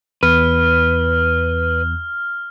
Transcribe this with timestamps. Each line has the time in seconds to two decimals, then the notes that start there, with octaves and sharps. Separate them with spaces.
0.23 E2 B4 F6